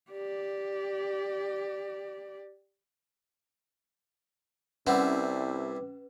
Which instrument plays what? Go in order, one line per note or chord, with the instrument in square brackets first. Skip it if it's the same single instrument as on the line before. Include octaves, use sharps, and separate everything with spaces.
[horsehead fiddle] G4 D5
[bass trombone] C2 [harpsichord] G3 C4 E4 [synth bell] C#4 B4 [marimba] F#5